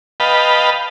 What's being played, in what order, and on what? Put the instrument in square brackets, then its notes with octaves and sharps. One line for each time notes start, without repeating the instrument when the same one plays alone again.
[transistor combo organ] B4 D#5 F5 G5 A5 B5